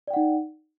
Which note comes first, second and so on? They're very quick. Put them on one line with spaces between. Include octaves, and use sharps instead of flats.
D5 G5 F#5 D#4